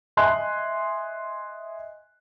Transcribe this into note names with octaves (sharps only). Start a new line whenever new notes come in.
D#5 E5 G#5 C6 F#6